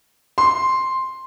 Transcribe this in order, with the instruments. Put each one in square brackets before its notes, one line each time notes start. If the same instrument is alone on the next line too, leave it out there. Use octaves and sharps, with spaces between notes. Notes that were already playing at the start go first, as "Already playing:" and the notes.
[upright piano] C6